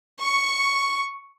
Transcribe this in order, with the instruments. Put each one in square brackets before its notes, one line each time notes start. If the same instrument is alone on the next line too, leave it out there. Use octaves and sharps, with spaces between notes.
[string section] C#6